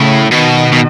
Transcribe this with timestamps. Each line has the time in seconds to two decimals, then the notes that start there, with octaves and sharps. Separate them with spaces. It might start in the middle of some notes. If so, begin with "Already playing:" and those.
Already playing: A2 C#3
0.31 B2 D#3
0.72 B2